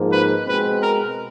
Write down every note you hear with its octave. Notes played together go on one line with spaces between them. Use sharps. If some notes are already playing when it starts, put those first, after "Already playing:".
Already playing: G#2 F3 A#3
B4
B2 G#3 C4 B4
A#4